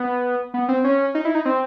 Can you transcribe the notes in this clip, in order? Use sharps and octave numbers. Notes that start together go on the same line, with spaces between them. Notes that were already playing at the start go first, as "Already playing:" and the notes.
Already playing: B3
B3
C4
C#4
D#4
E4
D#4
C4